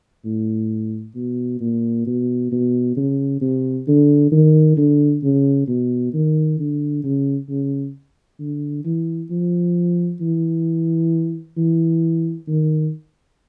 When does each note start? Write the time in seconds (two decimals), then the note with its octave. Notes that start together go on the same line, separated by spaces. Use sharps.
0.25 A2
1.15 B2
1.61 A#2
2.06 B2
2.51 B2
2.96 C#3
3.41 C3
3.87 D3
4.32 D#3
4.77 D3
5.23 C#3
5.68 B2
6.13 D#3
6.59 D3
7.03 C#3
7.49 C#3
8.39 D3
8.85 E3
9.30 F3
10.21 E3
11.57 E3
12.47 D#3